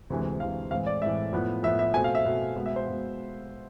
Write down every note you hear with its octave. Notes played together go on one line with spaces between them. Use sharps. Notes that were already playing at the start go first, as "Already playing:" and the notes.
D2 C3 E3 G#3
D2 C3 E3 G#3 F5
A2 E3 G#3 C4 F5
D5
A2 E3 G#3 C4 E5
A2 F3 B3
A2 F3 B3 E5
E5
B2 A3 C4 G#5
F5
E5
B2 A3 C4
B2 G#3 B3
E5
C5
B2 G#3 B3